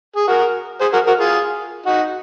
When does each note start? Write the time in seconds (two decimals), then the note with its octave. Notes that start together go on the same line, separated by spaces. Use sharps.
0.16 G#4
0.28 F#4 A#4
0.80 G#4 C5
0.93 F#4 A#4
1.07 F#4 A#4
1.20 F4 G#4
1.86 D#4 F#4